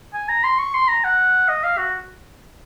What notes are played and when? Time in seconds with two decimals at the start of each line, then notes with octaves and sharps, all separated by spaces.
0.14 G#5
0.29 A#5
0.44 C6
0.59 C#6
0.75 C6
0.88 A#5
1.04 F#5
1.49 D#5
1.64 F5
1.78 F#4